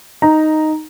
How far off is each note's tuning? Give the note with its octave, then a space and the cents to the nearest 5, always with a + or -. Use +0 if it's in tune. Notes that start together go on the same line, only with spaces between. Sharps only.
D#4 +0 A#5 +0